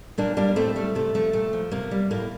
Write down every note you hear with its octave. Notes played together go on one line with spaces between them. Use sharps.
A#2 A#3 D4
G3 A#3 D4
A2 A3 C4
G3 A3
C3 A3
F3 A3
A#2 A3
F3
C3 A#3
G3
A2 A#3